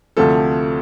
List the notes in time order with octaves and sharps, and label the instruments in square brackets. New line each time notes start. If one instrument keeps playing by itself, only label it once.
[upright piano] D2 C3 F3 A3 A4